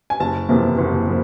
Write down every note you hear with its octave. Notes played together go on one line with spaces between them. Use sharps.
G#5
F#1 A5
E2 C3 F3 A#3
F#1
C3 F3 A#3